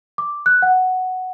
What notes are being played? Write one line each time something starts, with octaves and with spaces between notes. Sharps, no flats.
D6
F#6
F#5